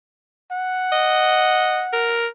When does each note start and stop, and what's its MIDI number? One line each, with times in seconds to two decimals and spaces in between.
0.51 2.18 78
0.92 1.81 75
1.93 2.27 70